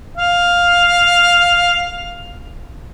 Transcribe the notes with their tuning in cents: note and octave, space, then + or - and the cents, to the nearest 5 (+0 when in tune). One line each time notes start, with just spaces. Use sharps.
F5 +5